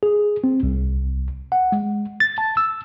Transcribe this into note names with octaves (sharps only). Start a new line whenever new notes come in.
G#4
C4
C2
F#5
G#3
A6
A5
E6